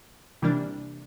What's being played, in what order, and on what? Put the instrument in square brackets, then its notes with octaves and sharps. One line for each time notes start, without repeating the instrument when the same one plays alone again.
[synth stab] C3 E3 G3 A#3 D4